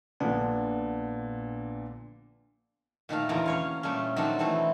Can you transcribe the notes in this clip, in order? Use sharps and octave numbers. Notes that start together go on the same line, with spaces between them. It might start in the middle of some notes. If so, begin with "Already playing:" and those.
A#1 A#2 D3 B3 D4
A#2 D#3 A3 F5
E2 B2 D3 A#3 A#5
C#4 C#5 F5
A#2 G3 A3 C#4
D#3 F#3 C4 D4 A4
B2 E3 A3 C4 A4